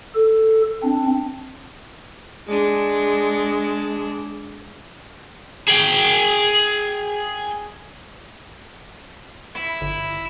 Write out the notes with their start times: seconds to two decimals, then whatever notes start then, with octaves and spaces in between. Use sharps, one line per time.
0.15 A4
0.83 C4 D4
2.47 G#3 D4
5.68 G#4 G5
9.56 E4
9.81 G1